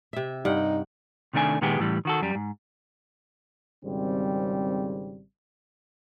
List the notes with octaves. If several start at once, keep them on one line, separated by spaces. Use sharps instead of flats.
C3 E5
G2 D#4 F#5 G5
C3 D#3 A3 D4 G#5
A#2 D#3 G#3 B3 G4 G#4
A2 E3 G3
D#3 F#4 A4
F#2 G3
G#2
G#1 C#3 G3 C4